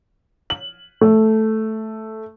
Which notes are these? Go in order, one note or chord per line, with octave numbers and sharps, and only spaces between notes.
F#7
A3